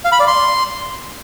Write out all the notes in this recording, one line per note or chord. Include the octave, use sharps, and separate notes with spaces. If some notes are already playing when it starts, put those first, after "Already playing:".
F5
B5
D5
C6